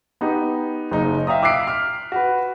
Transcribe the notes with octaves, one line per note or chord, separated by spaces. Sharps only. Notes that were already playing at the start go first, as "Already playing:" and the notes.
B3 D#4 G4
F#1 D#4
E5 F5 G5 A#5 D#6
D6 E6 F#6 B6 C7 D7
F6
F#4 B4